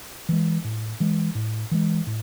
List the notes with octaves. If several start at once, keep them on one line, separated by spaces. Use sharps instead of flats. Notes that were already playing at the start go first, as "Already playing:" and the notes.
E3 G#3
A2
E3 G#3
A2
E3 G#3
A2